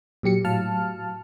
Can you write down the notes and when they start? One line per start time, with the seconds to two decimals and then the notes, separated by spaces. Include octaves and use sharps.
0.23 A#2 F#3 G4 C#7
0.45 A2 F#3 F5 A5 F6